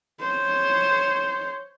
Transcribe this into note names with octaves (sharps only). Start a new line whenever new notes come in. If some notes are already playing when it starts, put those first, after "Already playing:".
C5 C#5